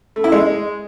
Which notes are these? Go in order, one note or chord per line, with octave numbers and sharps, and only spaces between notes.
A3
E4
G#3